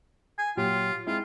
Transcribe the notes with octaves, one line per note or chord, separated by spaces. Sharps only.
G#5
A#2 F#3 F4 G4
G#3 C4 E4 F4